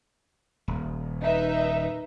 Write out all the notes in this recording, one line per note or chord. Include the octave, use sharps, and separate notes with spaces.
D#1
D#4 B4 E5